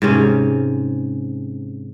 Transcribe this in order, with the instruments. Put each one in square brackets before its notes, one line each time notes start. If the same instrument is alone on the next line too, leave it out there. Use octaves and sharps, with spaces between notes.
[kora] G#2 C3 C#4